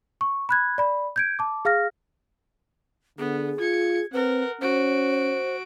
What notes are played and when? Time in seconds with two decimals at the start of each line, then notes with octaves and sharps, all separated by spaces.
0.21 C#6
0.49 B5 F#6 G#6
0.78 D5 B5
1.16 G6 G#6 D7
1.39 A5 D6
1.65 G#4 F5 F6 A#6
3.19 D3 B3 G#4
3.60 F4 G#6 C#7
4.13 C4 A#4 B4 F#5
4.61 C#4 F#4 C5 D7